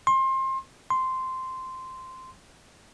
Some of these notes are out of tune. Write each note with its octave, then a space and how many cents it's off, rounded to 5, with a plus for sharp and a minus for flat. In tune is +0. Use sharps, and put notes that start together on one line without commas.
C6 +25
C6 -10